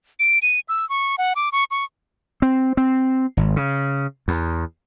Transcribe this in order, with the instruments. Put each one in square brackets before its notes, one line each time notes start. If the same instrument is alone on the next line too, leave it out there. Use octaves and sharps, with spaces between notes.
[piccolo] D7
D#7
E6
C#6
F#5
D6
C#6
C#6
[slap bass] C4
C4
G#1
C#3
E2